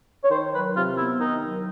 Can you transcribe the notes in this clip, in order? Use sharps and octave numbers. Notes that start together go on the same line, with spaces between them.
C#5
D#3 C5
F#3 B4
C3 F4
B3 E4
D#3 D#4
F#3